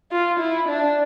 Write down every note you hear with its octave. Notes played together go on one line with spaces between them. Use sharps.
F4
E4
D4